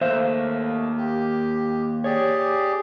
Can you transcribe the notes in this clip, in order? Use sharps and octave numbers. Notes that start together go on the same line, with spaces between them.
D#2 A3 C5 E5 F5
G4
G4 G#4 C#5 D5